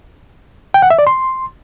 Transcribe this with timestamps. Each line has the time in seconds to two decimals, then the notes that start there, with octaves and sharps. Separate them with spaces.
0.74 G5
0.82 F#5
0.90 E5
0.99 D5
1.07 C6